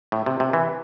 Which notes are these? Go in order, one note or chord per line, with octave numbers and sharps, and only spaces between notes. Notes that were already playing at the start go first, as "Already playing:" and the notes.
A2
C3
C3
E3